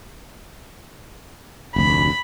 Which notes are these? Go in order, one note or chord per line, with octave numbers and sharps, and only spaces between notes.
F1 D2 B5